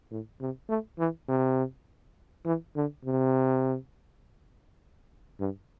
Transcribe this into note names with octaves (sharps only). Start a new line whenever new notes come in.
A2
C3
A3
E3
C3
E3
D3
C3
G2